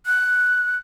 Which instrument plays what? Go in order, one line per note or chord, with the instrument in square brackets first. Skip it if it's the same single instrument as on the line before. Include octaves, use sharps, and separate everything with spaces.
[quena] F#6